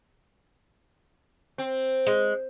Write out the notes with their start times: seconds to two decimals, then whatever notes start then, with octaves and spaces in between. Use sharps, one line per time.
1.58 C4
2.07 G#3